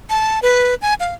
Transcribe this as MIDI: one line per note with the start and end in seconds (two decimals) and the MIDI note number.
0.10 0.39 81
0.42 0.75 71
0.82 0.94 80
1.00 1.14 77